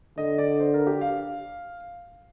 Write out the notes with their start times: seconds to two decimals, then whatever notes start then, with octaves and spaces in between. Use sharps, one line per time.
0.18 D3 D#5
0.38 D5
0.60 C5
0.74 A#4
0.87 G4
1.01 F5